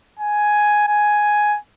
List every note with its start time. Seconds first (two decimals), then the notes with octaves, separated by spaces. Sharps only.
0.20 G#5
0.88 G#5